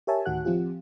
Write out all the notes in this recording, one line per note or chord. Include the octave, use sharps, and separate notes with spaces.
G4 A#4 C#5 E5 G#5 A5
D2 A2 D#3 F#4 F#5 F#6
F3 C4 F4 G4